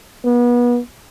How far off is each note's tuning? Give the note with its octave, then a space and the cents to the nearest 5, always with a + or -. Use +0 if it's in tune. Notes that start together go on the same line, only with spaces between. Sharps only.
B3 -30